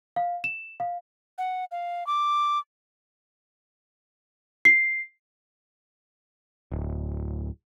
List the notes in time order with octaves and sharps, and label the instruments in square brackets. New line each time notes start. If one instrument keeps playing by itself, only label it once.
[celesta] F5
E7
F5
[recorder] F#5
F5
D6
[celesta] C7
[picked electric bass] D1